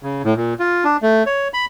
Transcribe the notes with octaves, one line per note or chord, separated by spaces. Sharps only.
C#3
A2
A#2
F4
D4
A3
C#5
B5